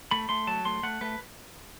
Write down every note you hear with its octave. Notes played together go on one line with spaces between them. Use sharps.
A3 B5
A3 C6
F#3 A5
A3 C6
A3 F#5
A3 B4